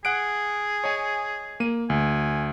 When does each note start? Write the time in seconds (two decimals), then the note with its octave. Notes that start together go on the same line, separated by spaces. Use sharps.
0.05 G#4 F#5 F#6 D7
0.84 C#5 D#5 G#5
1.60 A#3 D#7
1.90 D2 G#5